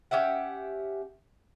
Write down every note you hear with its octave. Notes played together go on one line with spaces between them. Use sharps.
C#4 G4 E5 F#5